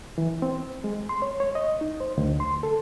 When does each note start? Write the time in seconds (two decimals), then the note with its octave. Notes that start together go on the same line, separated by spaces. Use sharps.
0.18 E3
0.42 C4
0.84 G#3
1.09 C6
1.22 C#5
1.40 C#5
1.55 D#5
1.81 D#4
2.00 C5
2.18 D2
2.40 C6
2.63 A4